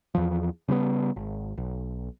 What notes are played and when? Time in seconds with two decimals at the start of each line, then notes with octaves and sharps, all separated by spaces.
0.15 E2 F3
0.68 C#3 G3 A#3 B3
1.16 G#1
1.58 B1